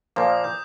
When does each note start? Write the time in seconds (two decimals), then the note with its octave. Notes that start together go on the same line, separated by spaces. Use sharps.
0.16 A#2 F3 A#3 D6
0.30 D#6
0.44 G6